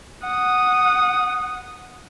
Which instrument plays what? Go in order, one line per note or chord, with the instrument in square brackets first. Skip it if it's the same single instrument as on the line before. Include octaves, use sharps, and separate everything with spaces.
[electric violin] F#5 D#6